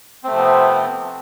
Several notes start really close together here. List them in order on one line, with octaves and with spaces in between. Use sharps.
C4 A3 C3 F3 B3